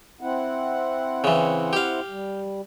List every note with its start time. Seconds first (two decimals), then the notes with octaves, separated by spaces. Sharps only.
0.21 C4 E4 F#5
1.24 C#3 E3
1.73 G4 F5
2.08 G3